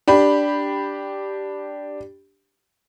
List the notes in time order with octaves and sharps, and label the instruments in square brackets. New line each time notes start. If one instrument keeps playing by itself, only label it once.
[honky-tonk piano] D4 G4 B5